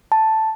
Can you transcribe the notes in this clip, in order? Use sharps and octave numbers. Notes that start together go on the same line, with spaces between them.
A5